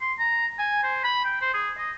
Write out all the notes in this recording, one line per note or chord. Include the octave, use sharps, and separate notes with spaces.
C6
A#5
G#5
C5
B5
G5
C5
G#4
D#5